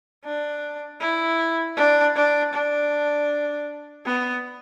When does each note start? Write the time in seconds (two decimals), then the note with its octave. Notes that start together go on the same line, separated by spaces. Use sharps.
0.25 D4
1.00 E4
1.76 D4
2.15 D4
2.54 D4
4.06 B3